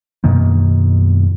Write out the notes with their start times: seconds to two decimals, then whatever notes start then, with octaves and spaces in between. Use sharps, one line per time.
0.24 F#2 B2 D#3 A#3